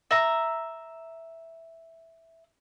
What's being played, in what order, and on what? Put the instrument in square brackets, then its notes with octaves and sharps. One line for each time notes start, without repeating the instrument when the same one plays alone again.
[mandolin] E5 A#5